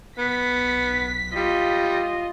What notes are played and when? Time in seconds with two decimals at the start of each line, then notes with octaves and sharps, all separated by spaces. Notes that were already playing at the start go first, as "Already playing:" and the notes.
0.18 B1 B3 B6
1.35 G3 F4 D#5